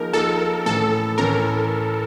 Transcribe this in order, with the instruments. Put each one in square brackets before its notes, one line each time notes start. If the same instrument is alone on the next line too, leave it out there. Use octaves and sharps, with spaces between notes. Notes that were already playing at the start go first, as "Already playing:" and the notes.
Already playing: [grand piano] F3 A#3 D#4 G#4 [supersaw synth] A#4
[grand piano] F3 A#3 D#4 G#4 [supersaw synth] A4
[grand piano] A2 E3 A3 C#4 [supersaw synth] A4
[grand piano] A2 E3 A3 C#4 [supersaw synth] A#4